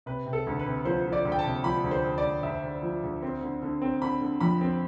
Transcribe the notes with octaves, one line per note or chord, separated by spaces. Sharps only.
C3 B4
C3
A4
D2
B4
C3
F3 C5
F3
D5
D2
G5
A5
C3
F3 B5
D2
C5
D2
D5
D2
D2 E5
D2
F3
D2
C4
D3
D3
C4
D3 B5
D3
F2 B5
C4